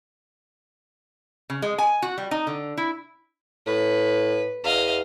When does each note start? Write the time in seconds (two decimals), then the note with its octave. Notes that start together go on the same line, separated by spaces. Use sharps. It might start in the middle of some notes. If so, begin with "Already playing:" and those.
1.50 C#3
1.62 G#3
1.78 G#5
2.02 F#4
2.18 G3
2.31 D#4
2.47 D3
2.77 E4
3.67 A2 B4
4.64 E2 D#5 F5